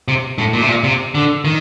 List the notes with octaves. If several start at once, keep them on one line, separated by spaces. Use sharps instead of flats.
C3
A2
A#2
C3
A#2
C3
D3
D#3